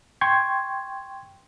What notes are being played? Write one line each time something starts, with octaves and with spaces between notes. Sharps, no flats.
G5 C6 C#6 G#6